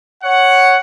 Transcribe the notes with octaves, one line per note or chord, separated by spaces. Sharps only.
C#5 F#5